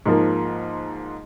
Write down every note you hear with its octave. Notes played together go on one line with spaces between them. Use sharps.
G#2 F3 A#3